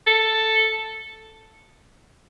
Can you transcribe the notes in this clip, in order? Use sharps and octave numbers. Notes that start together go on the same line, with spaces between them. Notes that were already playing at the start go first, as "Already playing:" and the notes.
A4